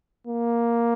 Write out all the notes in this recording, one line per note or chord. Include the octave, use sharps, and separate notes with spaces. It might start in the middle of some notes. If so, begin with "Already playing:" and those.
A#3